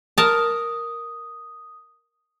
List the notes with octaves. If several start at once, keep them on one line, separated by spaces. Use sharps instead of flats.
A#4 A5 D#6